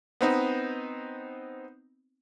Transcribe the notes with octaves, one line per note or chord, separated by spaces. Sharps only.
B3 C4 D#4